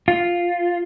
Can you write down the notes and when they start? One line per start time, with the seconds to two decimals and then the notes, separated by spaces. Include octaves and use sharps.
0.08 F4